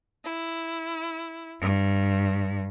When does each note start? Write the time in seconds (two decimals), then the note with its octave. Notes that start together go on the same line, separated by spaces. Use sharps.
0.25 E4
1.61 G2